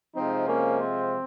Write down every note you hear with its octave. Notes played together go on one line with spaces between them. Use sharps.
C3 F3 G#3 C4 D#4
A#3 C#4
C4